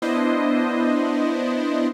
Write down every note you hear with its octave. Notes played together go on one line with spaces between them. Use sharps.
B3 D4 E4 C5 D#5